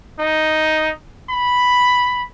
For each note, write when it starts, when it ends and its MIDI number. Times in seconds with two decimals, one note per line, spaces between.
0.19 0.90 63
1.30 2.23 83